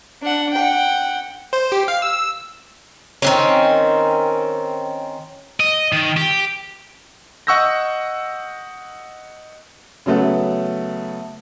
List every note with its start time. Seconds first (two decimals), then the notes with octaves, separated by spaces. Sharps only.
0.23 D4 F#5
0.54 F#5 G5
1.53 C5
1.72 G4
1.88 F5
2.02 E6
3.22 D#3 C4 C#4
5.60 D#5
5.93 D#3
6.17 G4
7.47 D#5 F#5 C#6 E6 G6 A#6
10.06 C#3 F#3 A3 B3